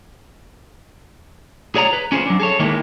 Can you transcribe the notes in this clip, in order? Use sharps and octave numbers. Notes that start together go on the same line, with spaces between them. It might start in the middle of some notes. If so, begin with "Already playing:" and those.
G#4 C#5 D5 A#5
B4
C#4 F4 G#4 C5
F#3 D4
G#4 A4 C#5
D#3 E3 G#3 A#3 E4